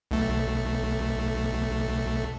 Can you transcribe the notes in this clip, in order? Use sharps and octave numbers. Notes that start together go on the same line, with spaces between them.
B1 A3